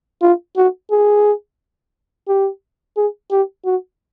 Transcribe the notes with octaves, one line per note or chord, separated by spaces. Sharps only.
F4
F#4
G#4
G4
G#4
G4
F#4